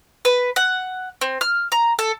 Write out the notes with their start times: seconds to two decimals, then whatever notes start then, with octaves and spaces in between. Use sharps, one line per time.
0.25 B4
0.56 F#5
1.21 C4
1.41 F6
1.72 A#5
1.99 A4